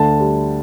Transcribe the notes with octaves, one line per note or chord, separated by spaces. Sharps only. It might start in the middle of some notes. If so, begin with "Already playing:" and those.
Already playing: D2 D3 A5
G3